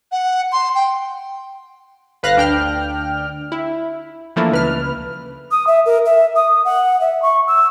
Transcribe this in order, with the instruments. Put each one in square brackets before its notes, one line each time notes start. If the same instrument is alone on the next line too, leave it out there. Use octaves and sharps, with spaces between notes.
[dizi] F#5
C6
G5
[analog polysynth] G1 B4 F5 F#6 A#6
D2 D4 G5 F6
E4
E3 F3 A3 A#3 D4 E4
C#2 B4 F6
[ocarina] D#6
E5
A#4
E5
D#6
F#5
E5
C#6
E6